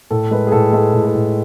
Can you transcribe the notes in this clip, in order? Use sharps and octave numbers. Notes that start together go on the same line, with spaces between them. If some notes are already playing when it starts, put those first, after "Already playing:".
A2 A4
G#3 B4
G#4
A2 A4
G#3 A4
A2
A4
A2